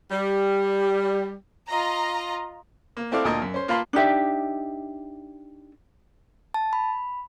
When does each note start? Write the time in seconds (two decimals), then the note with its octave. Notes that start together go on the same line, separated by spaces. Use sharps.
0.11 G3
1.70 F4 D#5 A#5
2.97 A#3
3.11 A3 C4 E4 A4 D5 F5
3.25 D2 A#2 A#4 D#5 A5
3.42 F#2
3.54 C#4 C5
3.68 A#3 F4 F5 A5 B5 C6
3.93 D4 D#4 G4 E5
6.54 A5
6.73 B5